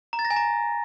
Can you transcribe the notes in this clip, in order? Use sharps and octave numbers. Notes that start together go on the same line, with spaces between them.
A#5
A6
A#6
G#5
A#5